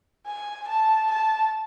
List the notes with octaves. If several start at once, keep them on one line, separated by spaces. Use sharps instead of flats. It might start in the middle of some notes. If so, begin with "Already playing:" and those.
G#5
A5
A5